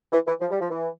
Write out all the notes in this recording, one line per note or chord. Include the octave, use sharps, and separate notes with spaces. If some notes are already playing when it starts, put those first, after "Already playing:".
E3
E3
F3
G3
F3
E3